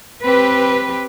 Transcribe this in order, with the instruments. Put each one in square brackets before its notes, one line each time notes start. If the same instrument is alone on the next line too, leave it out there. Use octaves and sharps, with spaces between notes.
[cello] C4 G4 [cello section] B4